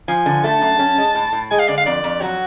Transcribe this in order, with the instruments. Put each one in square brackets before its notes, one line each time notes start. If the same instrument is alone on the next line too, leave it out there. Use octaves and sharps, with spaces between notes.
[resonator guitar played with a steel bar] F3 [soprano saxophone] G#5
[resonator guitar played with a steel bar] D3
[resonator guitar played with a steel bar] A3 [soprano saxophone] A5
[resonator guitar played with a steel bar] F#2
C#4
G#3
A2
A2
[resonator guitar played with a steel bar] G#3 [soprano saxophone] G#5
[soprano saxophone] F5
[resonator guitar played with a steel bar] D3 [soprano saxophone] D5
[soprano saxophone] F5
[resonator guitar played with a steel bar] F2 [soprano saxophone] D5
[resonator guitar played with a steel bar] F2
[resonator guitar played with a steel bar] F#3 [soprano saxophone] F#4